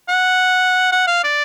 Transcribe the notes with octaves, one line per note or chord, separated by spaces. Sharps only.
F#5
F#5
F5
D5